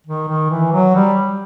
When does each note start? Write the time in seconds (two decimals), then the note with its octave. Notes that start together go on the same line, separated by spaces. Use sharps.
0.07 D#3
0.29 D#3
0.50 E3
0.72 F#3
0.95 G3